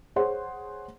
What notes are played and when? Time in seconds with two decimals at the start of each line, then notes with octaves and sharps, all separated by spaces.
0.16 G#4 C5 C#5 F#5 C6